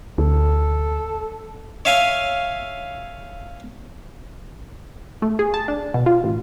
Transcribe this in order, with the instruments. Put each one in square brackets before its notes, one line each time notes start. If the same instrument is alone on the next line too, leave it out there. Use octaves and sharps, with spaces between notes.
[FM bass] D2 [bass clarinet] A4
[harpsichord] C#5 E5 F5 G#5
[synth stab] A3
G#4
A5
D4
B2
F4
A1